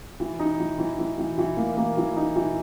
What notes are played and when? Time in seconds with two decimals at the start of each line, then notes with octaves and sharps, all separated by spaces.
0.20 E3
0.39 D#4
0.60 E3
0.79 E3
0.99 E3
1.18 E3
1.38 E3
1.57 A#3
1.77 A#3
1.97 E3
2.16 D#4
2.36 E3